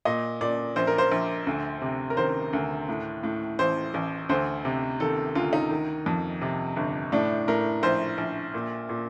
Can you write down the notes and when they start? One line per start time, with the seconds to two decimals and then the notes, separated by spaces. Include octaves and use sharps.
0.05 A#2 D#5
0.41 A#2 D5
0.76 A#1 C5
0.87 A#4
0.98 C5
1.12 A#1
1.47 D2
1.82 C3
2.10 A#4
2.17 D#3 C5
2.53 D2
2.89 A2
3.23 A2
3.59 A1 C5
3.94 A1
4.29 D2 C5
4.65 C3
5.00 D#3 A4
5.35 D2 F4
5.53 D#4
5.70 D#3
6.06 F2
6.41 C3
6.77 G1
7.12 A2 D4
7.48 A2 A#4
7.83 A#1 C5
8.18 A#1
8.54 A#2
8.89 A#2